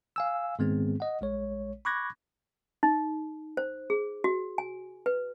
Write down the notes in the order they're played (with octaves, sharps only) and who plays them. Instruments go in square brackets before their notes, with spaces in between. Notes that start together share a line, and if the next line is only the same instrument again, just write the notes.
[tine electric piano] F5 G#5 E6
G#2 D#3 G#3 B3 C4 G#4
D#5 F#5
A#1 G#3 C#5
B5 C#6 D6 F#6 G#6 A#6
[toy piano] D#4
C5
G#4
F#4
G#5
B4